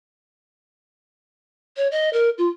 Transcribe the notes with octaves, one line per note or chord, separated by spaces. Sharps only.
C#5
D#5
A#4
F4